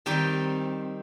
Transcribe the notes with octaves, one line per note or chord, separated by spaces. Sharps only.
D#3 G3 C4 D#4 G4